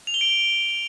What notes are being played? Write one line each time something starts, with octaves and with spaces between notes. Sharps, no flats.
F7
G7
D7